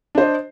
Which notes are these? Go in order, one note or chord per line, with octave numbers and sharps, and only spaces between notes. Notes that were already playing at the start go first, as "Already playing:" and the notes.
D4 C5 D#5